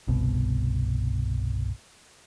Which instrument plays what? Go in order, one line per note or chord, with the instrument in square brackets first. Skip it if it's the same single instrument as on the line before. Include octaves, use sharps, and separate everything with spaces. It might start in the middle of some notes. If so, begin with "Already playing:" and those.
[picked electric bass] G1 C2 B2